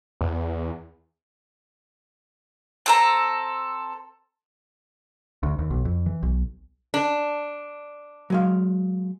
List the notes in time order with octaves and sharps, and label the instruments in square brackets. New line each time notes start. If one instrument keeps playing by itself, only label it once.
[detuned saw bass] E2
[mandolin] C4 A4 A#5
[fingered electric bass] D2
D#2
B1
F2
E3
B1
[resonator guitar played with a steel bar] D4
[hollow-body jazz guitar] F#3 G#3 F5